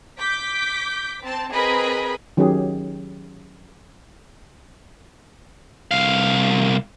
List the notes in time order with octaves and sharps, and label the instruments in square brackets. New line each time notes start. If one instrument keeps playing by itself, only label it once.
[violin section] D6 G6 B6
C4 A5
C4 G#4 A#4 B4 D#5 B5
[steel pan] D#3 F#3 C#4 G4 G#4
[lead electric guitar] C2 F5